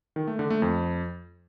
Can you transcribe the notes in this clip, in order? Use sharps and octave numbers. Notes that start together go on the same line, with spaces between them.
D#3
A3
D3
A3
F2